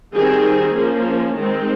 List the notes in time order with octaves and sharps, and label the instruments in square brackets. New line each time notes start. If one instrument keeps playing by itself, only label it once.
[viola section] D#3 G3 C4 G#4
F3 A#3 C#4
D#3 G#3 C4